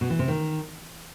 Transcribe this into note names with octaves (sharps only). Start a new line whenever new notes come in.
B2
E3
C3
D#3